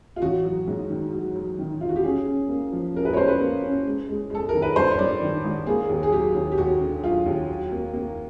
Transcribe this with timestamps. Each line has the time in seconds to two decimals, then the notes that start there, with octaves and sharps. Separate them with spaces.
0.16 F4
0.22 A1 F#4
0.45 F#3
0.68 G#2
0.90 D#3
1.13 F#3
1.36 F#3
1.59 D#3
1.81 D#3 F4
1.89 F#4
1.96 G4
2.04 C#4 G#4
2.27 C#4
2.48 A#3
2.72 F3
2.94 C#4 A#4
3.05 B4
3.13 C#5
3.17 C#4 C5
3.28 B4
3.40 A#3
3.63 C#4
3.86 G#3
4.08 G#3
4.30 G#3 A4
4.49 A#4
4.54 D#3
4.62 B4
4.76 G2 C5
4.91 C#5
4.99 G2 D5
5.22 D#3
5.44 G#1
5.67 A#3 G#4
5.89 D#2
6.03 G#4
6.12 F#3 G4
6.35 D#2
6.52 G4
6.58 D#2 F#4
6.80 D3
7.03 F#3 F4
7.26 D#2
7.49 F#3
7.72 A#3
7.93 A#3